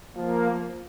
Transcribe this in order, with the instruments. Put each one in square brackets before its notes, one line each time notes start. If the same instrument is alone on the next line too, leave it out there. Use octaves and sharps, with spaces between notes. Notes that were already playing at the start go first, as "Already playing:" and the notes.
[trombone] F3 [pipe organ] A#3